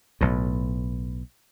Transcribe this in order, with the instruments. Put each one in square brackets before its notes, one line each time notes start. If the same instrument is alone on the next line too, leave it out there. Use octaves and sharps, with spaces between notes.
[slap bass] B1 A2